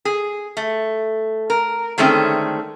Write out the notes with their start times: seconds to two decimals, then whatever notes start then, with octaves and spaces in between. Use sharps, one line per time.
0.05 G#4
0.57 A3
1.50 A#4
1.98 D3 D#3 G#3 A3 C4 C#4